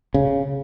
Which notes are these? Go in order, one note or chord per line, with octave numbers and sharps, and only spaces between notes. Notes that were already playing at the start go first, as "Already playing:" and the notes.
C#3